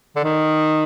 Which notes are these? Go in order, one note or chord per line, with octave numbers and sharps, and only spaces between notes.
D3
D#3